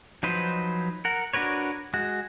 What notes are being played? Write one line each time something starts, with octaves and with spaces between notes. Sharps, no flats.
F3 F#3 D#4 B4 C5
A#4 F#5
D4 F#4 A#4 B4 C#5
G#3 F#4